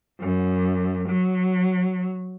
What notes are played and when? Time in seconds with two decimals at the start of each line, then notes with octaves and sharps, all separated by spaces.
0.20 F#2
1.08 F#3